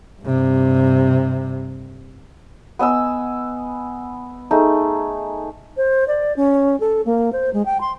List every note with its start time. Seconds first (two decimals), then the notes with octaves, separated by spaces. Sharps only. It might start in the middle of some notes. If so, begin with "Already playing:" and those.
0.21 G2 C3
2.79 B3 D#5 G#5 E6
4.51 A3 D#4 G#4
5.77 C5
6.08 D5
6.36 C#4
6.80 A4
7.06 A#3
7.33 C5
7.53 G#3
7.66 G5
7.81 C6